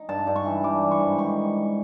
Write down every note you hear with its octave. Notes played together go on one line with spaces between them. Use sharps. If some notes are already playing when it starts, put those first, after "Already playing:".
Already playing: D#4
G2 A5
G2
C#6
E3
G3 D6
E3
C#6
G#2
D#3 C#6